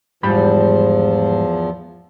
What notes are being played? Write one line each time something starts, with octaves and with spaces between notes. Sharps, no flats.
E2 G#2 F3 G3 B5